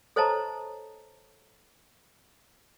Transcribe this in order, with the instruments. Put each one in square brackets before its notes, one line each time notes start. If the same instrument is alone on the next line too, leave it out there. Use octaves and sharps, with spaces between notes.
[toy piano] A4 C5 C#5 D#5 A5 A#5